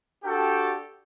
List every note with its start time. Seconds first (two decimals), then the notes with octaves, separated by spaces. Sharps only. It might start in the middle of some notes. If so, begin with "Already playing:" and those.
0.23 D4 F#4 G4 A4 G5